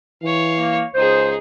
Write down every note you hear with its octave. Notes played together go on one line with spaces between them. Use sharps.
E3 C#5 F5
A#3
C#2 D#4 G#4 C5